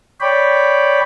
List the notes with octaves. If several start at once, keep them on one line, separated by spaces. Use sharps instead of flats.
C#5 D5 G5 B5